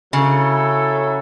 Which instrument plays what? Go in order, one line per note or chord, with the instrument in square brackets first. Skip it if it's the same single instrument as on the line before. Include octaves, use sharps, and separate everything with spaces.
[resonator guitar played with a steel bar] C#3 [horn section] F#3 C#4 E4 A4